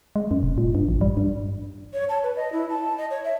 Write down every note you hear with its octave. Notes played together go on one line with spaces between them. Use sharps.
G#3
F#2
F1
A#2
G2
A1
G3
G2
C#5
A5
B4
D#5
E4
A5
D#5
C#5
E5